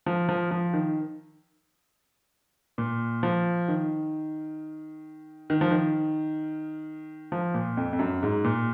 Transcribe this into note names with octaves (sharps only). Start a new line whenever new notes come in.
F3
F3
F3
D#3
A#2
F3
D#3
D#3
F3
D#3
F3
A#2
F2
F2
F#2
G#2
A#2